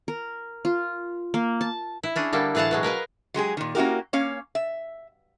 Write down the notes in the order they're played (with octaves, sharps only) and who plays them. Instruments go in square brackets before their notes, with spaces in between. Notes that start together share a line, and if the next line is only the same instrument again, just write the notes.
[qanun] A#4
F4
A#3
A5
[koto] E4
C#4 D4 G#4
D3 G3 A#3 A4
A2 E3 G#4 F5 F#5 A5
B2 F#3 G#3
A#4 B4 D#5 F5
[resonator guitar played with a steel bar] F#3 G#3 G4 G#4
A#2 D#3
A#3 C#4 E4 F#4 G4 A#4
A#3 C#4 C#5 F5
E5